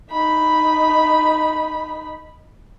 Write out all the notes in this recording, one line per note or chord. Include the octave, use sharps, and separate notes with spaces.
D#4 B5